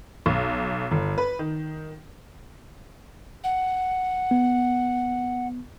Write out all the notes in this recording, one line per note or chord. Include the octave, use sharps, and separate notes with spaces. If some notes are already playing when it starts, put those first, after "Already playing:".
B1
G1
B4
D#3
F#5
B3